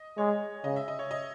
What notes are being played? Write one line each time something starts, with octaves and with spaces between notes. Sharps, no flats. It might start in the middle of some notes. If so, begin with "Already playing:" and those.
Already playing: D#5
G#3 C#5
C#3 D#5
E5
D#5
C#5
D#5